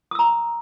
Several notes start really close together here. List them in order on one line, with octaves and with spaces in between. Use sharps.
D#6 E6 A#5